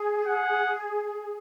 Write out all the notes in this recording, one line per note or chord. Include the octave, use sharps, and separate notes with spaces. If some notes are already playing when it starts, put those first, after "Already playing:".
Already playing: G#4
F#5